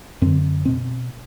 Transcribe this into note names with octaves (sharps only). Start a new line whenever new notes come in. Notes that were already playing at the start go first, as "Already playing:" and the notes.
F#2 D3 C4
B2 C4